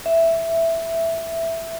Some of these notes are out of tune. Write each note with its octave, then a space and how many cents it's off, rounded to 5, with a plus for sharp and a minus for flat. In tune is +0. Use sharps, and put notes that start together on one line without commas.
E5 +5